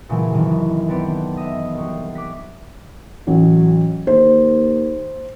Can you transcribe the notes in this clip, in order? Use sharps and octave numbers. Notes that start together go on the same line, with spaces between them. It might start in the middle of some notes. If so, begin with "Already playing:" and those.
A#2 C#3 E3 F#3 G#3 A3
F#2 C3 D#3 E3
B3 C4 A4 B4 D5
D#5 E5
C2 F#4
D6 F#6 B6
A1 F#3
D#2 C5